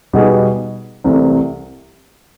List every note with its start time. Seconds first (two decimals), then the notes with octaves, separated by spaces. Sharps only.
0.13 B2 G3 B3 D#4 G#4
1.04 C2 C3 E3 A3